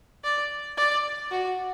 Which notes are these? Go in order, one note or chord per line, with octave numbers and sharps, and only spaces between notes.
D5
D5
F#4